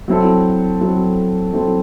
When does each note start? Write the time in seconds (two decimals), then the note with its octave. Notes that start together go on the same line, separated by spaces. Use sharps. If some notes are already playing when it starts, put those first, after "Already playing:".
0.08 F#3 C4 E4 A4
0.81 F#3 C4 E4 A4
1.53 F#3 C4 E4 A4